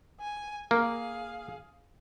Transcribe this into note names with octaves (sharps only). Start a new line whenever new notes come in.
G#5
A#3 G#4 F5